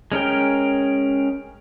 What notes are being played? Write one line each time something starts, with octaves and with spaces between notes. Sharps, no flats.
G#3 C#4 A#4 G5